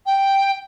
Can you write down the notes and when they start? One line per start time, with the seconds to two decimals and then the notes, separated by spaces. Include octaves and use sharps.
0.06 G5